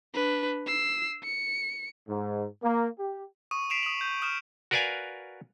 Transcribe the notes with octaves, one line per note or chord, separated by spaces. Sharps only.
D4 B4
E6 C7
C#7
G#2
A#3
G4
C#6 D#6 D#7
B6 C7 D7 E7 F7
D#6 F#7
G6
D#6 F6 E7
F#4 A#4 B4 D5 F5 G#5